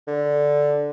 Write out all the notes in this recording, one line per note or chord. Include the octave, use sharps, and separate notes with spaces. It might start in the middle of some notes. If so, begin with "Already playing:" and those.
D3